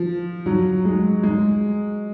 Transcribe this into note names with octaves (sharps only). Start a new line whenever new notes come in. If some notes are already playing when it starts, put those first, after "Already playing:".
Already playing: F3
F#3
G#3
G#3